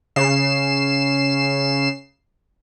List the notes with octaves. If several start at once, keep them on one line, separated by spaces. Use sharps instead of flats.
C#3 C7 E7